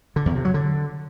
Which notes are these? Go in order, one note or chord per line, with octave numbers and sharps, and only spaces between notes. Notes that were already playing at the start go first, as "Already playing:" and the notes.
D3
E2
C3
F#3
D3